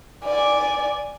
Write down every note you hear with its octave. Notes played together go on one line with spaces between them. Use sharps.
D5 G#5